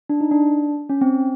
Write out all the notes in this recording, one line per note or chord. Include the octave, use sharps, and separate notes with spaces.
D4
D#4
D4
C#4
C4